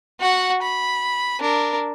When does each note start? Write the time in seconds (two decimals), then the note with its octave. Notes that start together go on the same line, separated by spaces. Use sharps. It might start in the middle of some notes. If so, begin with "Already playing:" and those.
0.20 F#4 F#5
0.62 B5
1.40 D4 A#4